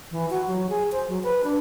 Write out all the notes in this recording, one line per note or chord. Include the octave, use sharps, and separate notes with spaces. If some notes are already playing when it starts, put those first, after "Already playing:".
E3
F#4
F#3
G#4
C5
F#3
B4
D4